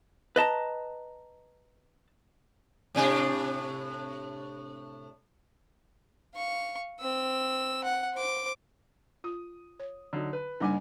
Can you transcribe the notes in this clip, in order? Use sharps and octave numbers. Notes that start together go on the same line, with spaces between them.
B4 D#5 A5 A#5
A2 C3 D4
F5 C#6
C4 E6
F#5
C5 D6
F4 D#6
C#5
D3 F#3 D#4
B4
F#1 G3 D4 D#4 F#5 G#5